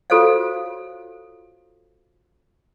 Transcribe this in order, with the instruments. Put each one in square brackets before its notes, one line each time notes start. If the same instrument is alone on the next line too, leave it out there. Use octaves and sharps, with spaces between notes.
[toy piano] F4 F#4 A4 C5 C#5 F5